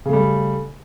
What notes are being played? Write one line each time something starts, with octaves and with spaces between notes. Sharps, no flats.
C#3 G3 A3